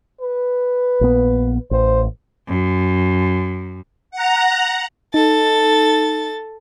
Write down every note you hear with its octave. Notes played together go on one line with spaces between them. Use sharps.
B4
A#1 B3
A1 C5
F#2
F#5 A#5
D#4 A4 A6